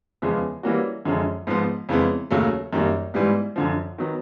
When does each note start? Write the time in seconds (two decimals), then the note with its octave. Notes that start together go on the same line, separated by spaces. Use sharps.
0.22 E2 C#3 F3 G#3 B3
0.63 E3 G3 A#3 C#4 F#4
1.05 F#2 D3 F3 G#3 C#4
1.47 G#2 F3 G#3 B3
1.89 F2 C#3 E3 G#3 B3
2.31 D#2 C#3 F#3 A3
2.73 F#2 D#3 G3 A#3
3.14 G#2 E3 G3 B3
3.56 F#2 D3 F3
3.98 D#3 F#3 B3